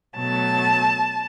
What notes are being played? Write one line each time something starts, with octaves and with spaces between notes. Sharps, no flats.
B2 F#3 A3 A5